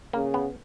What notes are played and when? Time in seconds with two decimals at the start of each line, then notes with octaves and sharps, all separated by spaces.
0.13 C#3 A#3
0.34 B3